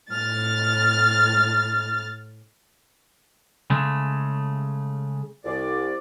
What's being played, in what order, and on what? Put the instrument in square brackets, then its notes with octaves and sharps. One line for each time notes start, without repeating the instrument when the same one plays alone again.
[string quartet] A2 F6 A6
[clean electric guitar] C#3 G#3 A3
[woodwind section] C2 D5